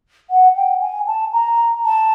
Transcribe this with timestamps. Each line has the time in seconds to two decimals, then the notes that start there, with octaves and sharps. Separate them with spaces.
0.30 F#5
0.56 G5
0.81 G#5
1.07 A5
1.32 A#5
1.85 A5